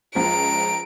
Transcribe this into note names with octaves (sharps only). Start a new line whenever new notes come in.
C#2 F3 A#5 D7